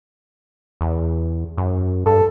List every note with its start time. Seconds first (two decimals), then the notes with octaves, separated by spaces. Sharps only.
0.81 E2
1.57 F#2
2.06 G2 A4